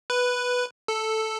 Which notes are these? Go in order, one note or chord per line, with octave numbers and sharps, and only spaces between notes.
B4
A4